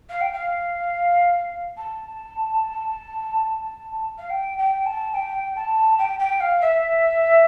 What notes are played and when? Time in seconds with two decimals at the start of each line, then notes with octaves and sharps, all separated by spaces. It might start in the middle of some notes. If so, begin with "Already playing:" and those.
0.09 F5
0.21 G5
0.33 F5
1.77 A5
4.18 F5
4.30 G5
4.58 G5
4.86 A5
5.14 G5
5.56 A5
5.98 G5
6.19 G5
6.40 F5
6.61 E5